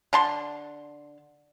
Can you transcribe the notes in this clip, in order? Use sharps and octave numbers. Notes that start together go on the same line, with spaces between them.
D3 A5 C6